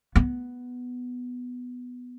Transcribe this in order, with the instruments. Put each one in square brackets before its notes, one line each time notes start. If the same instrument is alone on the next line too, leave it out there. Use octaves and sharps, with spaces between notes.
[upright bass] B3